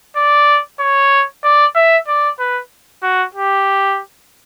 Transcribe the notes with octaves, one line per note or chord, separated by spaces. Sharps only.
D5
C#5
D5
E5
D5
B4
F#4
G4